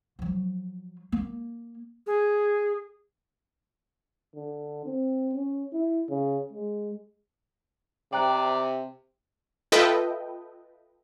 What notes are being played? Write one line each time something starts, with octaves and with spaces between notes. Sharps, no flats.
F3 F#3
A#3
G#4
D3
C4
C#4
E4
C#3
G#3
C3 D5 G5 A#5 F#6
F4 A4 B4 D#5 E5 G5